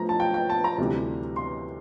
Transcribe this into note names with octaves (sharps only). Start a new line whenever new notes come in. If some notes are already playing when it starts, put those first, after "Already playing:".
Already playing: A2 F3 A3 A#5
A5
G5
G5
A5
A#5
D2 C3 E3 G3
C6